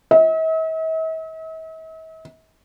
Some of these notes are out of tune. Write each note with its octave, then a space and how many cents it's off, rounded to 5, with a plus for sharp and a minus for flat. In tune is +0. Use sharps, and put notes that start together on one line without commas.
E5 -45